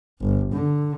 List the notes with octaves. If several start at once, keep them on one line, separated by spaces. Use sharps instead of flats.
G1
D3